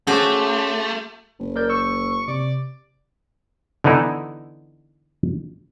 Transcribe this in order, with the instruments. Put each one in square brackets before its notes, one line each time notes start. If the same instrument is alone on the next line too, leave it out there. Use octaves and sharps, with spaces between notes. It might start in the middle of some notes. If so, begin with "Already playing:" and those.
[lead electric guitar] A3 [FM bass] C#4 [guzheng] F#4 C5 [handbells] G#4 D6
[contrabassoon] F#1
[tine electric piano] A#4 D5 G6
[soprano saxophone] C#6 [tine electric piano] E6
[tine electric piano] C3 [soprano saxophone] D5
[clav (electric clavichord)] D3 E3 B3 D#4 E4